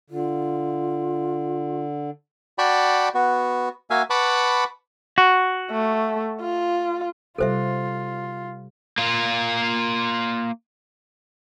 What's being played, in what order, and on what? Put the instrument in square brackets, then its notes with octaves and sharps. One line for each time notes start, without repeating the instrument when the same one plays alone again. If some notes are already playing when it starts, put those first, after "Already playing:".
[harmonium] D3 [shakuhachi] F4
[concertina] F#4 D5 G5 A5 B5 C#6
B3 F#4
A#3 F#4 E5 F5 G#5
B4 F#5 A5 B5 C#6 D6
[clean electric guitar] F#4
[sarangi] A3
F4
[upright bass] C3 G3 [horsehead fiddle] F4 [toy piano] A4 C5 E5
[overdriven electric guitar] A#3 F4